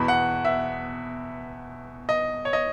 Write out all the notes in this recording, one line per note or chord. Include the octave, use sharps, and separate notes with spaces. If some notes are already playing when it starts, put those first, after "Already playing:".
Already playing: E2 B2 B5
F#5
E5
D#5
C#5
D#5